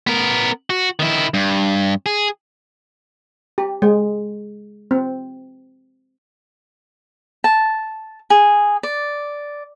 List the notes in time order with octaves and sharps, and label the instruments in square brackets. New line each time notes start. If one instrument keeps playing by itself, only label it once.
[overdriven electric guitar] B3 A#4
F#4
D#3 E4
G2
G#4
[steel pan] G4
G#3
C4
[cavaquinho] A5
G#4
D5